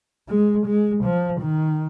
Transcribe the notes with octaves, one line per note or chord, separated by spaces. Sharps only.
G#3
G#3
F3
D#3